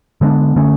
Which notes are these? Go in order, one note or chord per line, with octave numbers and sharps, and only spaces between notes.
D3 G#3 B3 D4
D3 A3 C#4